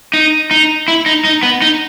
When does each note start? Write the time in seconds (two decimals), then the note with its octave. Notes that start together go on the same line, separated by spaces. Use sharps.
0.13 D#4
0.51 D#4
0.88 E4
1.06 D#4
1.24 D#4
1.43 B3
1.62 D#4